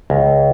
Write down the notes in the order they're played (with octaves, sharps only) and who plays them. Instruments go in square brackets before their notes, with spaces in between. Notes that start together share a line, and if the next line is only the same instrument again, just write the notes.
[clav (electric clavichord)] C#2